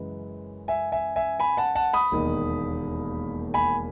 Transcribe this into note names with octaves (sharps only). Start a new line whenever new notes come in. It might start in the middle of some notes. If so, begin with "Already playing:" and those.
Already playing: F#2 C#3 E3 G#3
E5 G#5
E5 G#5
E5 G#5
G#5 B5
F#5 A5
F#5 A5
B5 D#6
E1 D#2 D#3
G#5 B5